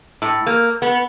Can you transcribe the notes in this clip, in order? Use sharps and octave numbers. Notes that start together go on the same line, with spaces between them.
A2
A#3
B3